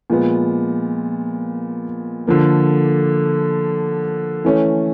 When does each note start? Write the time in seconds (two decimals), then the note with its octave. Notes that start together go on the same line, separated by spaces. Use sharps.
0.10 A#2 F3 G#3 B3
2.27 D3 F3 A#3
4.45 E3 A3 C#4